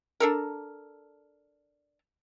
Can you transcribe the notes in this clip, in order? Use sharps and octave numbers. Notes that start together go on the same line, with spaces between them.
D4 A4 A#4